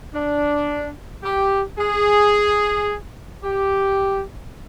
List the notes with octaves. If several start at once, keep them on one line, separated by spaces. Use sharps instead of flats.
D4
G4
G#4
G4